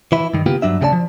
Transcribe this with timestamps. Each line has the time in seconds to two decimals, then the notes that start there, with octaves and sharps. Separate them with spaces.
0.12 E3 E4
0.34 G2 D#3
0.46 C#3 A#3 B3 F4 G4
0.62 G2 F#3 D4 E5
0.81 D2 C#3 G4 G#4 D5 A5
0.93 F3